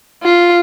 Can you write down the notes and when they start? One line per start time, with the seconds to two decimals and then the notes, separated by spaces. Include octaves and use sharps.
0.23 F4